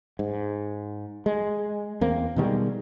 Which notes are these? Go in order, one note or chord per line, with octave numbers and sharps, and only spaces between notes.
G#2
G#3
E2 A#3 C4
B2 D#3 G3 G#3